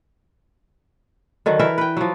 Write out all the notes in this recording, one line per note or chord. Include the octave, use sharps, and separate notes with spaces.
D3 D#3 F#3
E3 A#4 E5
B4 G5
F3 F#3